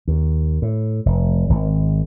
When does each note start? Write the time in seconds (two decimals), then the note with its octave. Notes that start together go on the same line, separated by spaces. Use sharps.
0.08 D#2
0.62 A2
1.06 F1
1.50 G#1